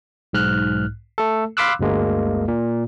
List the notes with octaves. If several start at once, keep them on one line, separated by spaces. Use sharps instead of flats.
B1 G#2 F6 F#6
A3 A4
F5 B5 C6 D6 E6 F#6
G1 D2 G#3 A#3
A#2